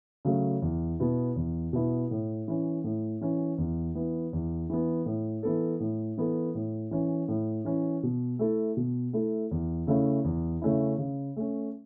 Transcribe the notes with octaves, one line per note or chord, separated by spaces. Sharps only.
C#3 F#3 A3
E2
B2 B3 E4
E2
B2 B3 E4
A2
E3 C#4
A2
E3 C#4
E2
E3 B3
E2
E3 B3
A2
E3 B3 A4
A2
E3 B3 A4
A2
E3 C#4
A2
E3 C#4
B2
A3 E4 A4
B2
A3 E4 A4
E2
C#3 A3 C#4 E4
E2
C#3 A3 C#4 E4
C#3
A3 C#4